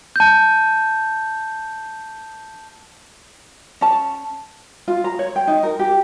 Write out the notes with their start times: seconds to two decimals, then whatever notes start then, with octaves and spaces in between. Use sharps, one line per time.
0.16 A5 G6
3.81 C#4 A5
4.88 F4
5.04 A#5
5.19 C#5
5.36 G5
5.47 D#4
5.63 A#4
5.79 G4